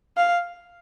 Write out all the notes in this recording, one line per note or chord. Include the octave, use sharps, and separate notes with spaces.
F5